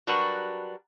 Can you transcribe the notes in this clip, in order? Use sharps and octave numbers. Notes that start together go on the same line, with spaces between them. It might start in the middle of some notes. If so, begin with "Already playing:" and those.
F#3 G3 D4 F#4 A#4 B4